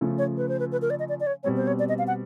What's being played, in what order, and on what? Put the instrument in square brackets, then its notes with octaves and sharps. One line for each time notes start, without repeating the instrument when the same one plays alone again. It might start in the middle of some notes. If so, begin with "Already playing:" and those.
[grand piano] C#3 F3 A3
[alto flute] C#5
B4
C5
B4
B4
A#4
D5
D#5
D5
D5
C#5
[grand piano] B2 G3 C4 [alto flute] C#5
[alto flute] C5
C#5
D5
D#5
F5
F#5